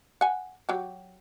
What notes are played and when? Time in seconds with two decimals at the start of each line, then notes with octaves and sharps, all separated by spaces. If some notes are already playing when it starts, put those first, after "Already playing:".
0.21 F#5 G#5
0.69 F#3 G4